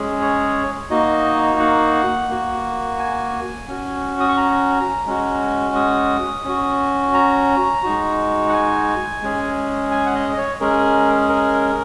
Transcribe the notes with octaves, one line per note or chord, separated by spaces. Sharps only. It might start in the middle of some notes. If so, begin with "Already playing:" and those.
Already playing: G#3 C#4 G#4
C#5
A#3 D#4 F#4 D#5
F#5
A#3 F#4
G#5
C#4 F#4
D#6
C#6
A#5
G#3 C#4 F#4
D#6
C#4 F#4
A#5
G#3 D#4 F#4
F#5
G#5
G#3 C#4 G#4
G#5
F#5
D#5
D#5
C#5
G#3 C#4 G#4 A#4
A#4